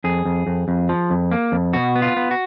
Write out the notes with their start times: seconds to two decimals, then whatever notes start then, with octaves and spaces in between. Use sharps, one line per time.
0.04 F2 G#4
0.25 F2
0.47 F2
0.68 F2
0.89 F3
1.10 F2
1.32 A#3
1.52 F2
1.73 B2 F#4
1.96 B3
2.02 F4
2.16 B3
2.31 F#4